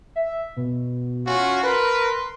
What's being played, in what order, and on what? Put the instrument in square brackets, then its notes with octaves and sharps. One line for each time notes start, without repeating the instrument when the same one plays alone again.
[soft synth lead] E5
B2
[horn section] C#4 F4 F#4
[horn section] A#4 B4 [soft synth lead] C6